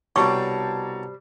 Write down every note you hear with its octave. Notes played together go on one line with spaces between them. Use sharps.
C2 B2 G3 C4 C#5 A5 A#5 C#6